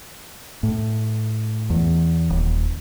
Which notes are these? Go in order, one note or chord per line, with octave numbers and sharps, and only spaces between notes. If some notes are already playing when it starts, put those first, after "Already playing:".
A2
E2
D#1